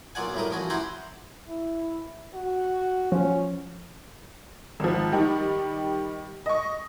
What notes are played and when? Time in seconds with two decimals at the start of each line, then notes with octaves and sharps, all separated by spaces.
0.15 B1 A#3 F4 D5 F#5 G#5
0.35 A2 G3 A#4 D#6
0.51 A1 F3 F#4 G#5
0.70 E4 G4 F#5 G#5 A#5 C6
1.49 E4
2.34 F#4
3.12 F3 C#4
4.80 G#1 F3
5.13 D#3 G3
6.46 D#5 C#6